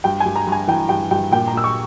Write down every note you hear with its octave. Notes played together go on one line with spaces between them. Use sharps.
G2 G5
G2 G#5
A#5
G2
G#5
E3 G5
G2 G5
G2 G5
A#2 G5
A#5
A#2 E6
C#6